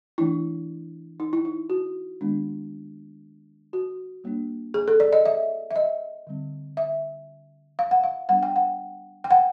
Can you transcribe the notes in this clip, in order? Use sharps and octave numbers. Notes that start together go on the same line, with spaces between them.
E3 A3 D4 E4
D#4
E4
D#4
F#4
D#3 G#3 B3 D4
F#4
G3 A#3 D4
G#4
A4
D5
D#5
E5
E5
D#5
D3 G3 C4
E5
F5
F#5
F5
G3 B3 D4 F#5
G5
F#5
G5
F#5